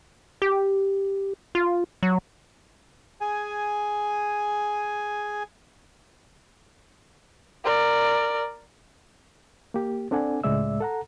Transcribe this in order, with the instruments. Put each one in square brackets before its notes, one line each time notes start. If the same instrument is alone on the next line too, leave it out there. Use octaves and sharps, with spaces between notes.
[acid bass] G4
F4
F#3
[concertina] G#4 G#5
[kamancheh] A#4 D5
[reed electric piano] A#3 G4
C4 D4 A4 D5 F#5 G#5
C#2 A2 G#3 D5 E5 E6
A4 F#5 A#5